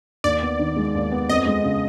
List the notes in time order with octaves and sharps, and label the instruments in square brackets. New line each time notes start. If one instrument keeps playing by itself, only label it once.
[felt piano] D#2 [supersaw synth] D5
[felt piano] B3
D#3
G#3
D#2
B3
[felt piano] F2 [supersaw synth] D#5
[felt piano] G#3
C#3